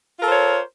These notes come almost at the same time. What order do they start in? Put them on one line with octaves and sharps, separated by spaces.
F4 A#4 A4 C5 C#5